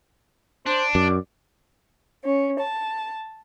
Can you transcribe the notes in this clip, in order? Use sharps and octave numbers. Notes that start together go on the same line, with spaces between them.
D4 C5
F#2 D5
C#4
A5